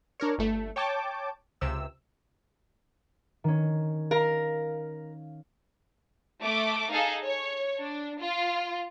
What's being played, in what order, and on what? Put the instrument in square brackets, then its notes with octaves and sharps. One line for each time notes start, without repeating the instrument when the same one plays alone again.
[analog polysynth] D4 A#4 C#5
G1 A3
C#5 G5 A5 D6
C#2 C3 E6
[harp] D#3 C#4
[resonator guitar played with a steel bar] A#4 [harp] F5
[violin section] A3 D6
D#4 G#4 A4 F5
C#5
D4
F4